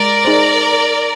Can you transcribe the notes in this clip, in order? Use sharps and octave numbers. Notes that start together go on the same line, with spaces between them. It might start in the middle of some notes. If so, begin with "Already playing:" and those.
Already playing: G#3 A#4 D5
D#4 G#4 C5